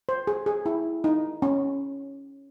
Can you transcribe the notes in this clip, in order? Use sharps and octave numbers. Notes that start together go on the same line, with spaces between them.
C5
G#4
G#4
E4
D#4
C#4